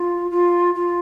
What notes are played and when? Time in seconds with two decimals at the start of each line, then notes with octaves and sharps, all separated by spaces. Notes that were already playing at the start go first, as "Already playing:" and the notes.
Already playing: F4
0.31 F4
0.75 F4